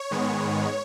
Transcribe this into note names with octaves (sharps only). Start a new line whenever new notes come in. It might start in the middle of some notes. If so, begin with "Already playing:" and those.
Already playing: C#5
G#2 D#3 G#3 B3